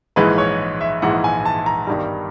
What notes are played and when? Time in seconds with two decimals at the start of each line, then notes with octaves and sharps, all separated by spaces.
0.16 A#1 G#2 E3 G#3 B4
0.38 C#5
0.81 E5
1.02 A#1 G#2 E3 G#3 F#5
1.24 G#5
1.45 A5
1.66 A#5
1.87 G1 G2 D#3 G3